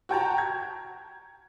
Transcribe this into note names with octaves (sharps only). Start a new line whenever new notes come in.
F#4 G5 A5 A#5
G#6